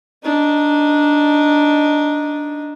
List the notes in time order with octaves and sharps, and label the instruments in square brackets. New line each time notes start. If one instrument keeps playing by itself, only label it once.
[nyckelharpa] D4 D#4